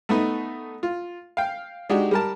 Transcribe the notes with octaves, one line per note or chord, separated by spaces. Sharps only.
A3 B3 D#4
F4
F5 G5
G#3 D4 D#4 F#4 G4
G3 A#4 A5